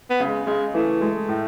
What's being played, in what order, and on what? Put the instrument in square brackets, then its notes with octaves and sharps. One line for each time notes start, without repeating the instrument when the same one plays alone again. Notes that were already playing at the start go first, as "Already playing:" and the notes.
[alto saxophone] B3
[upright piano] C#3
[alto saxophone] G#3
[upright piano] C#3 [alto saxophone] G#3
[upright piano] E3 [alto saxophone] A3
[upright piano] G#3
A2